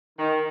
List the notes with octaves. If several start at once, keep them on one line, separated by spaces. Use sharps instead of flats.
D#3